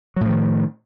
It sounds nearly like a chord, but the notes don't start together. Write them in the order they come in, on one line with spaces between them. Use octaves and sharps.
F#3 A2 F3 D#3